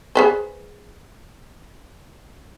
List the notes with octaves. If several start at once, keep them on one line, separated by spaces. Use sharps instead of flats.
G#4 B4 C5